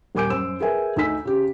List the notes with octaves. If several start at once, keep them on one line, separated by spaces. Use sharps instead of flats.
D#1 A#4 G#5 D6 G6 D7
F#2 C5 E6 E7
G#4 A#4 B4 E5 G#5
D2 D#4 G#5 E6 B6
C#3 G4